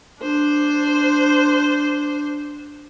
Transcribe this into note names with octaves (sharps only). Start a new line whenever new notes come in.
D4 C5